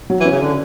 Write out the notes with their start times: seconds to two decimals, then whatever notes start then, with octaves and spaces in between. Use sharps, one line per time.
0.10 F#3
0.20 E3
0.26 C#4
0.32 C#3
0.42 D3 D4